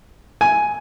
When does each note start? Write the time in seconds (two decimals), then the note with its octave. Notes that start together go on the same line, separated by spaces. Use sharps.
0.41 G#5